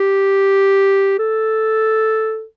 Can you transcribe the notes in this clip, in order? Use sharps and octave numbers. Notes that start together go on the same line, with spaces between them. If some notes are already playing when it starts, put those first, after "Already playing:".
Already playing: G4
A4